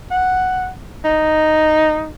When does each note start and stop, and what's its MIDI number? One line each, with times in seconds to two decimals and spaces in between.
0.11 0.69 78
1.04 2.12 63